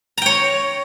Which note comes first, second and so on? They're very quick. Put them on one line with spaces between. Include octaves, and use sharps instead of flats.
A#5 G5 C#5